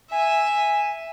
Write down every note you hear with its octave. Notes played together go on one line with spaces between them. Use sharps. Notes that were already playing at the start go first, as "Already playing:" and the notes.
E5 G#5